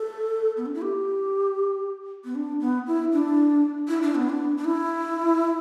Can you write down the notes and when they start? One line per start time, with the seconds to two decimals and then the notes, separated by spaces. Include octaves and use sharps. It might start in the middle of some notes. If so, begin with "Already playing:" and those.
Already playing: A4
0.57 B3
0.66 D4
0.74 E4
0.82 G4
2.25 B3
2.35 D4
2.61 B3
2.87 E4
3.13 D4
3.88 E4
4.01 D4
4.15 B3
4.29 D4
4.57 D4
4.65 E4